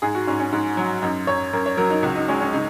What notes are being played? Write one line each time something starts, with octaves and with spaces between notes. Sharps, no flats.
G#2 G#4
F#4
G#2 C#4
C#4
G#2
F#3
F#2 D#4
F#2 C#5
F#2 A#4
C#5
F#3 A#4
D#4
C#2 F#4
D#4
G#3 C#4
C#4
C#3 D#4